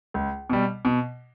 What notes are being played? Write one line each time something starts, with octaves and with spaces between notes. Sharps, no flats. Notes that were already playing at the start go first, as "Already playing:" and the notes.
C#2
B2 G3
B2